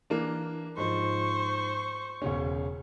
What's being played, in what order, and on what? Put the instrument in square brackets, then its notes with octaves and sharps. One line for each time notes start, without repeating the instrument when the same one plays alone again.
[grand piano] E3 A#3 D4
[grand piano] G#2 F3 [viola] C5 C#6
[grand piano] E1 C#3 C#4